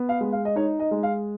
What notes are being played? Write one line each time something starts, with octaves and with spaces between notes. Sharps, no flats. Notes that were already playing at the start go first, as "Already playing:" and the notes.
Already playing: B3
F5
G#3
F5
D#5
D#4 C#5
D#5
G#3
F5